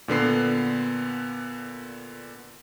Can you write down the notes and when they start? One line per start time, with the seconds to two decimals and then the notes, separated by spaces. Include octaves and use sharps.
0.08 A#2 D3 B3 C7